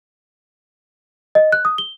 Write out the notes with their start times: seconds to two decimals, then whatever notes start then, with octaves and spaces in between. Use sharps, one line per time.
1.35 D#5
1.52 F#6
1.65 D#6
1.78 G7